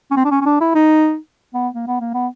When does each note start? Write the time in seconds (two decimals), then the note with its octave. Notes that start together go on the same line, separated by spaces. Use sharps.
0.11 C#4
0.16 C4
0.25 D4
0.31 C#4
0.41 C#4
0.46 D4
0.61 E4
0.75 D#4
1.54 B3
1.74 A#3
1.87 B3
2.00 A#3
2.14 B3